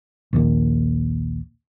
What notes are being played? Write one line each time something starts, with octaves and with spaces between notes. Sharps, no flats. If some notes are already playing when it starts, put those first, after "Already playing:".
A#1 D#2 A#2